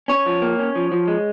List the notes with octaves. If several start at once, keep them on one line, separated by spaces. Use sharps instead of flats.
C#4 C#5
F3
A#3
C#4
F3
F3
G#3